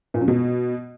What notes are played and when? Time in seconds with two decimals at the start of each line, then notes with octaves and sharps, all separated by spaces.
0.14 A#2
0.21 F#2
0.28 B2